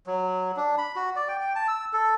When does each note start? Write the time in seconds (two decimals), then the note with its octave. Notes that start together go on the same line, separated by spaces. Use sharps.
0.06 F#3
0.57 D4
0.78 B5
0.96 F#4
1.16 D5
1.29 G5
1.41 G5
1.56 A5
1.68 E6
1.93 A4